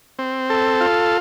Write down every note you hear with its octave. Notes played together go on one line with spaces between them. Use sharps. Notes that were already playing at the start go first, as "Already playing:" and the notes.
C4
A4
F4